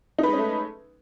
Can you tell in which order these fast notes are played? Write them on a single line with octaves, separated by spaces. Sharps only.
D#4 B4 G#3 C#4 A3